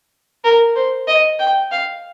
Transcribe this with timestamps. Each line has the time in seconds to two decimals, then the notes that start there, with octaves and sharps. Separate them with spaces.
0.44 A#4
0.76 C5
1.08 D#5
1.39 G5
1.71 F5